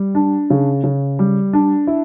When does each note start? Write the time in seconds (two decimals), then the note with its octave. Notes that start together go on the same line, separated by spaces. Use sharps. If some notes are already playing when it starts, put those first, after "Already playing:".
Already playing: G3
0.15 D4
0.50 C#3
0.84 C#3
1.19 G3
1.53 D4
1.87 E4